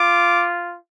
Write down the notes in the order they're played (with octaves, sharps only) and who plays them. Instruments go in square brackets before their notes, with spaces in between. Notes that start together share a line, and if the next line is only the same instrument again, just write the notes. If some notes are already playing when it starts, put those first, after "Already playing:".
Already playing: [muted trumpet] F4 [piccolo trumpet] D6